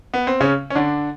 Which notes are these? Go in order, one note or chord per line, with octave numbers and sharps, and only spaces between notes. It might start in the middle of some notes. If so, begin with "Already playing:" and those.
B3
C4
C#3 C#4
C#4
D3 D4